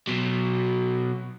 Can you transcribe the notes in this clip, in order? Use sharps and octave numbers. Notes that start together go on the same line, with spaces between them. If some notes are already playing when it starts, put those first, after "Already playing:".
B2 F#3